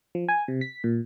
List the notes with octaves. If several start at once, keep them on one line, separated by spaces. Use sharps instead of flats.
F3
G#5
C3
B6
A#2